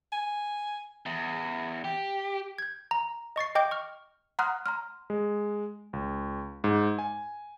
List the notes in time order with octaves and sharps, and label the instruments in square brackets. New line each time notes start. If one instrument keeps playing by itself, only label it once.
[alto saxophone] G#5
[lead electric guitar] E2
G4
[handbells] G6 G#6
A#5
D#5 C#6 A6 C7
D#5 G5 D6 G6
C#6 F6
[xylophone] F#5 A#5 C6 D#6 F6 F#6
A#5 C6 F6
[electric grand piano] G#3
C#2
G#2
G#5